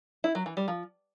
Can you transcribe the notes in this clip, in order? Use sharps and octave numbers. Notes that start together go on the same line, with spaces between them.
E4
F#3
E3
G3
F3